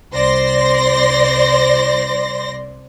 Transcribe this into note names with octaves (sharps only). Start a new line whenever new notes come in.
C2 C5 D5 C6 A#6